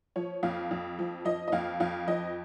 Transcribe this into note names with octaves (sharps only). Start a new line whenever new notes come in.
F3 C#5
F2 F5
F2
F3
F3 D#5
D#5
F2 F5
F2 F5
F3 D#5